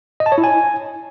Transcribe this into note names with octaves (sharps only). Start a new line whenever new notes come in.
D#5
A5
C#5
E4
G#5